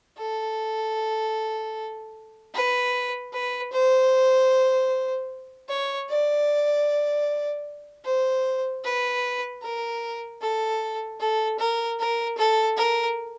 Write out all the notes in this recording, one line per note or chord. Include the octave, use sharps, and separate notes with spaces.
A4
B4
B4
C5
C#5
D5
C5
B4
A#4
A4
A4
A#4
A#4
A4
A#4